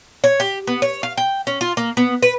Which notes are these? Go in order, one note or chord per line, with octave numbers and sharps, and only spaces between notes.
C#5
G4
B3
C#5
F5
G5
C#4
F4
A#3
B3
B4